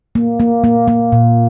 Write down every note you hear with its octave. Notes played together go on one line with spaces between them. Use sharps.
A#3
A#3
A#3
A#3
A#2